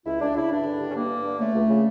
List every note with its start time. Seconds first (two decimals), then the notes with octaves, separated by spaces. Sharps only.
0.06 C#2 E4
0.21 C#2 D4
0.35 C#3 E4
0.50 G2 D4
0.65 D3
0.80 G2
0.91 C#4
0.95 G2 A#3
1.09 G2
1.25 D3
1.39 C#3 A3
1.55 C#2
1.69 C#3